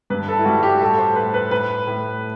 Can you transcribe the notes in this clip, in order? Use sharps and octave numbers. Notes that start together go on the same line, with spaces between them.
G2 B4
A4
E4
G3 F#4
G4
A2 A4
C5
A2 B4
B4
A2 B4
A2